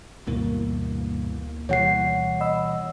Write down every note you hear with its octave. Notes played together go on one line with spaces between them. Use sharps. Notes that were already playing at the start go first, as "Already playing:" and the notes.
D2 G2 B2 E3 A#3
B2 E3 G3 C#5 F#5 C7
D#5 B5 E6